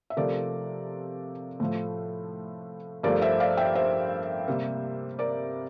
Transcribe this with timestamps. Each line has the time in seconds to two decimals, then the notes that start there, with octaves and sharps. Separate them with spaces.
0.10 E5
0.17 C3 F3 A3 A#4 D5
1.60 A2 F3 A3
3.03 G2 F3 A3 A#4 D5
3.21 C5 E5
3.40 D5 F5
3.57 E5 G5
3.75 C5 E5
4.48 C3 G3 A#3
5.19 A#4 D5